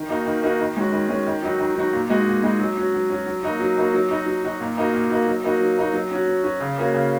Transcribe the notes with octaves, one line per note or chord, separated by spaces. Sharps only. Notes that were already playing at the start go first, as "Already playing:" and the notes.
Already playing: D#3
A#3 D#4 F#4
D#3
A#3 D#4 F#4
D#3
G#3 C#4 F#4
D#3
G#3 C#4 F#4
D#3
F#3 D#4 F#4
D#3
F#3 D#4 F#4
A#2
G#3 D#4 F#4
A#2
G#3 D#4 F#4
F#3
C#4 F#4
F#3
C#4 F#4
F#3
A#3 D#4 F#4
F#3
A#3 D#4 F#4
F#3
D#4 F#4
F#3
D#4 F#4
A#2
A#3 D#4 F#4
A#2
A#3 D#4 F#4
F#3
A#3 D#4 F#4
F#3
A#3 D#4 F#4
F#3
C#4 F#4
F#3
C#4 F#4
C#3
A#3 C#4 F#4
C#3